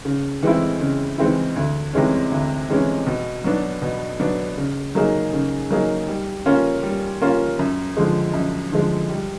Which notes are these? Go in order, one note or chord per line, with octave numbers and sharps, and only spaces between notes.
C#3
E3 G#3 C4 E4
C#3
E3 G#3 C4 E4
D2
C3 E3 G#3 C#4
D2
C3 E3 G#3 C#4
B2
F#3 B3 D4
B2
F#3 B3 D4
C#3
F#3 A#3 D#4 G#4
C#3
F#3 A#3 D#4 G#4
G3
A#3 C#4 F4
G3
A#3 C#4 F4
F#2
D3 F3 G#3
F#2
D3 F3 G#3
G3